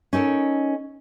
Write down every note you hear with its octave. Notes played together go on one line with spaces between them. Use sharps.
C#4 D#4 A4 A#4